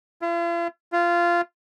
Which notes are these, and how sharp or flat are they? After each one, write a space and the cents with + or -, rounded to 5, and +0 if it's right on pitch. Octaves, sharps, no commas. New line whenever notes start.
F4 -45
F4 -15